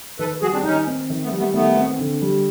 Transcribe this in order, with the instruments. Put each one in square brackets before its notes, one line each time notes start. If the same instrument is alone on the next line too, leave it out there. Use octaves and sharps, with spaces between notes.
[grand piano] D#3 [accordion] A4 B4
[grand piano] G3 [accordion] F#4 G#4
[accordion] C4 D4
[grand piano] D#3 [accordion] C#4 D#4
[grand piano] C4
D#3
[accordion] A3 B3
[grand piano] G3
[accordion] A3 B3
[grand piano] D#3 [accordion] A3 B3
[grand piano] C4
D3
G3